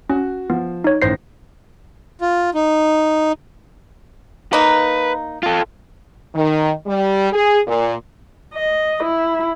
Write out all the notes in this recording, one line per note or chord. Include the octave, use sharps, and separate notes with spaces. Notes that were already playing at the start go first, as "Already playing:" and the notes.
C#4 F#4
F3 B3
D#4 C#5
A1 D#3 C5 A#6 C7
F4
D#4
A#3 D#4 B4
F4 A4
D#3
G3
G#4
A#2
D#5
E4